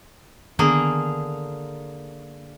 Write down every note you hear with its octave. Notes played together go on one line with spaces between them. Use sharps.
D3 D#3 A#3 B3 G#4